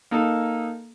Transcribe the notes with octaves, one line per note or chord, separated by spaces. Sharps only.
A#3 D#4 A4